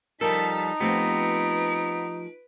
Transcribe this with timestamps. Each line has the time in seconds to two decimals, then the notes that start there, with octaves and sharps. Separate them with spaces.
0.21 F3 G3 D#4 A4 A#4 A5 B6
0.80 F3 A3 B3 C4 G4 B4 D7